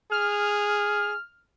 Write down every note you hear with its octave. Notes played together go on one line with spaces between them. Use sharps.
G#4 F6